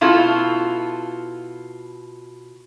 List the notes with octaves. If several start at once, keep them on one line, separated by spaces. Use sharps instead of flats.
B2 E4 F4 A4